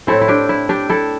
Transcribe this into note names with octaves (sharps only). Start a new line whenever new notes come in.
A2 A3 C4 E4 A4
E4
D4 G4
E4
D4 G4
E4 A4